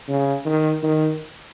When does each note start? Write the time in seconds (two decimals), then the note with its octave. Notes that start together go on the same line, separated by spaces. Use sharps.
0.08 C#3
0.45 D#3
0.83 D#3